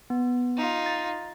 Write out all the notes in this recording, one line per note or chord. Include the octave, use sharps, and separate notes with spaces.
B3
D#4 F4
A6